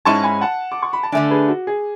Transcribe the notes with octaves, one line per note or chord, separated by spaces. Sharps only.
G#2 G#3 C#4 E4 A5 C#6
G#5 B5
F#5 A5
D6
C#6
B5
A5
D3 A3 D4 E5 G#5
G#4 B4
F#4
G#4